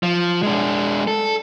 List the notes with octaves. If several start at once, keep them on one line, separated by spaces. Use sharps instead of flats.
F3
G#3 D4
A4